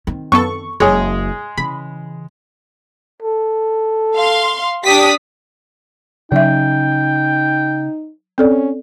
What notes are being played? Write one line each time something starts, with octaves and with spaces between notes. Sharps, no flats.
D#3 C4
F#2 B3 A4 C#6
F#1 G#3 G#4 C#5
C#3 E3 B5
A4
F5 C6
D4 G4 D#6 B6
C#3 F#3 C#4 D#4 E5 G5
C4 C#4 A4 D5